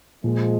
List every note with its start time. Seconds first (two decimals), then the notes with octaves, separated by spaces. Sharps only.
0.24 A#2 F3 G#3